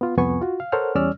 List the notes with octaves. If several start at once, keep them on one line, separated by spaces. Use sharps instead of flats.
B3 F4
C2 F2 B3 G#5 C#6
F4 F#4
F5
A4 A#4 C5 C#5 F#5 F6
E2 G3 C#4 D5 E6 F6